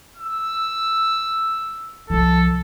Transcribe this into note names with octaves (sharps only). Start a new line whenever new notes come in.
E6
C2 F3 A4